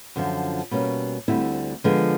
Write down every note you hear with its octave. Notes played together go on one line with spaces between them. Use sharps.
F#2 D3 F3
B2 G3 A#3 C#4
D2 D3 G3 C4 E4
D3 F3 G#3 B3